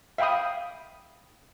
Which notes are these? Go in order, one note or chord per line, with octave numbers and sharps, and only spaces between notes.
E5 F5 G5 B5 D#6